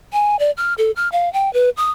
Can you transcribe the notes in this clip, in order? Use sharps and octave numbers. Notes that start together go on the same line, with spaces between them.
G#5
D5
F6
A4
F6
F5
G5
B4
D#6